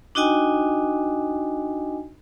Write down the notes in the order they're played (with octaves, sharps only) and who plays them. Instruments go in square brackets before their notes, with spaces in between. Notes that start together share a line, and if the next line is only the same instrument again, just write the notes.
[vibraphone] D4 D#4 F#4 D#5 G5 G#5